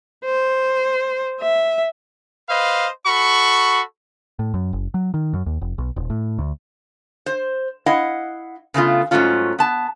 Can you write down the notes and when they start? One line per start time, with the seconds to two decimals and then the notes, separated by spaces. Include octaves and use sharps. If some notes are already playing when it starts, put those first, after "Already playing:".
0.25 C5
1.41 E5
2.49 B4 C5 D#5 F5
3.06 F#4 A4 B5 C#6
4.39 A2
4.54 F#2
4.73 F#1
4.94 F#3
5.14 D#3
5.33 F#2
5.46 D#2
5.61 F1
5.78 B1
5.96 D#1
6.10 A2
6.38 D2
7.26 C5
7.86 E4 D#5 F5 F#5
8.74 C#3 A3 B3 F4
9.11 G#2 B2 F#3 A3 C#4 F4
9.59 B3 A5